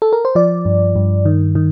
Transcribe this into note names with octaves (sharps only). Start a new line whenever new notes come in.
A4
A#4
C5
F3 D5
G2
G2
D#3
D#3